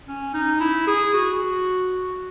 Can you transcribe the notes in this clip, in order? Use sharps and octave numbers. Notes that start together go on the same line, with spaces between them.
C#4
D#4
E4
G#4
F#4